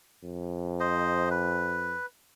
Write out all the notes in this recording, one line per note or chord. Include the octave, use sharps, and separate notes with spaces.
F2
C5 D#5
B4